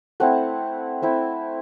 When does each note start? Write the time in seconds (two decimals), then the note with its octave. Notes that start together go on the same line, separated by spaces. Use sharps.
0.20 A3 C4 E4 F#5
1.02 A3 C4 E4